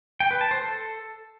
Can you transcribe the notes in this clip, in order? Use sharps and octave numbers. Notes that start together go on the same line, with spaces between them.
G5
B4
A5
C5
A4